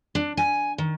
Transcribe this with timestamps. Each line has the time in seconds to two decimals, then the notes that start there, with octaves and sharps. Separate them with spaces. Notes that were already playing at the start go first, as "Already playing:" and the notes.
0.15 D4
0.37 G#5
0.78 D#3